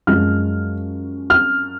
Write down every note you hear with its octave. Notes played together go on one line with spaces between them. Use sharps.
F#2 F3 G#3 C#4 F6
F6